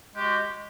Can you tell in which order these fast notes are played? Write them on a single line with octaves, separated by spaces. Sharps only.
G#3 G4 F#4